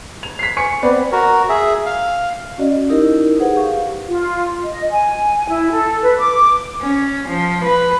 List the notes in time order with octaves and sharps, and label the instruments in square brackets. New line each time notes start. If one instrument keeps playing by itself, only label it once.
[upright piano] F7
B6 C7
G#5 C#6 C#7
B3 C4 B4 D5
[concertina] F#4 A#4
G#4 E5
F5
[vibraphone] C#4 F#4 D5 D#5
D#4 E4 G4 A#4
D#4 G#4 B4 C5 F#5
G4 F5 C#6
[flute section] F4
D#5
G#5
E4
A4
B4
D6
[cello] C#4
F3
B4